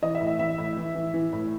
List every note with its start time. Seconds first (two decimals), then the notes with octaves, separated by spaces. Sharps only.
0.02 E3 D#5
0.15 E5
0.21 A2
0.27 E5
0.39 E3 E5
0.58 A2
0.77 E3
0.95 E3
1.14 E3
1.33 A2